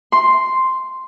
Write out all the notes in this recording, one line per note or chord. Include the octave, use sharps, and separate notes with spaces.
C6